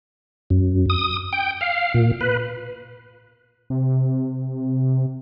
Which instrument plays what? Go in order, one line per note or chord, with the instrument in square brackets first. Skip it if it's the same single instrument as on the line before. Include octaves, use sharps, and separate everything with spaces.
[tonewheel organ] F#2
D#6
G5
F5
A#2
B4
[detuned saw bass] C3